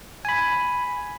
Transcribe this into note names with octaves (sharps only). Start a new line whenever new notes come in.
G#5 B5